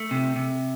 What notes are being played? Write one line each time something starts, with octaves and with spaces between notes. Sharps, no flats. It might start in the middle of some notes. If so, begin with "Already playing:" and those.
Already playing: A3
C3
C3